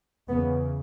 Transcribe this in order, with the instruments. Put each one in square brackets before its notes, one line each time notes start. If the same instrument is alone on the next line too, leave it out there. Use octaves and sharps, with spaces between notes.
[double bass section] E2 C#3 B3